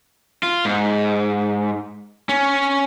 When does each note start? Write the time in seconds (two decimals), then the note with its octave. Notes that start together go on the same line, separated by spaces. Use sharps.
0.43 F4
0.65 G#2
2.29 C#4